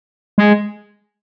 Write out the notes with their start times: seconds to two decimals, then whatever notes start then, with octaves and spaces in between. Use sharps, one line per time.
0.38 G#3